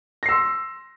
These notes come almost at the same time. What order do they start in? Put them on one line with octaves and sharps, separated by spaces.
A#6 C7 E6 C6